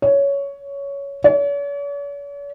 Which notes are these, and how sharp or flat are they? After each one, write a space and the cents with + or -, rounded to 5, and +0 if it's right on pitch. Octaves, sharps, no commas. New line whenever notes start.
C#5 +10
C#5 +45